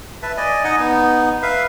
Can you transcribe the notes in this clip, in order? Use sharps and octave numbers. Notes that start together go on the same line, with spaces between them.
B4 E5 A5
D5 D#5 G#5
D#4 D#5 F#5 G#5
B3 D#4
B4 E5 F5